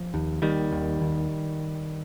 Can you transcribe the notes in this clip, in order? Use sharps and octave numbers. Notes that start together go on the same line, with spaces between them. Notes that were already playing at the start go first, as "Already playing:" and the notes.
Already playing: F3
D#2
D#2 D#3 G3
D#2
D#2